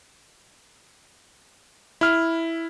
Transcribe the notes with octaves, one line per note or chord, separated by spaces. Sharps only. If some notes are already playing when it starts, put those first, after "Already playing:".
E4 F6